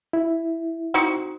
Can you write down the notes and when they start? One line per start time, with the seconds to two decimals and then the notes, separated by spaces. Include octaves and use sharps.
0.13 E4
0.94 C4 D#4 F#4